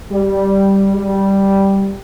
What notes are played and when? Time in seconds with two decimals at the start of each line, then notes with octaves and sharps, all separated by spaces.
0.11 G3
0.95 G3